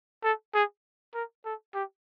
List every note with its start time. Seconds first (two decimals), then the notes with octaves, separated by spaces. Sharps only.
0.23 A4
0.54 G#4
1.14 A#4
1.45 A4
1.74 G4